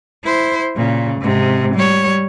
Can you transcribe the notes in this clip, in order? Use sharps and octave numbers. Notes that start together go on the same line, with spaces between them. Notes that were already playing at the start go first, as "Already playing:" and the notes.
E4 C5
A#2 C#3
G#2 C3
G3 C#5